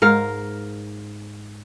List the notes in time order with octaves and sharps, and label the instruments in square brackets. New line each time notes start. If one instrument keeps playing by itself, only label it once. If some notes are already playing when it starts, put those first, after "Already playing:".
[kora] G#2 A#4 F5